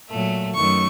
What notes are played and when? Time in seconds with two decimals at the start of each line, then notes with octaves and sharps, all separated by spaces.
0.09 A#2 F#3 A3
0.54 F#2 D#3 F#3 A3 C#6